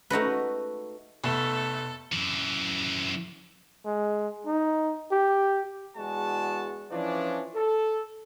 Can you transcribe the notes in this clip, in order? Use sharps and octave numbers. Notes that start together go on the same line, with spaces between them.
A3 D#4 F#4 B4
F1 A3 B3 A4 A5 E7
F#2 E3
G#3
D#4
G4
E2 G#3 F#4 A5
E3 F3 C#4 D4 D5
A4